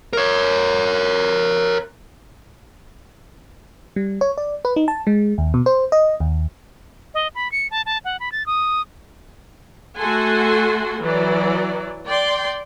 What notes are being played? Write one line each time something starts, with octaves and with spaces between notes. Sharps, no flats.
A#4 C#5
G3
C#5
D5
B4
D#4
A5
G#3
D#2
B2
C5
D#5
D#2
D#5
B5
C#7
A5
A5
F#5
B5
A6
D#6
A3 F#4 A4 F#5 G#5 C6
E3 F#3 D5
D5 G5 C6